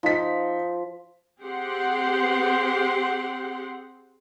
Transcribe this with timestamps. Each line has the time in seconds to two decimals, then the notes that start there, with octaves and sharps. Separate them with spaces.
0.03 F3 D#4 B6
1.42 C4 G4 G#4 F#5 C6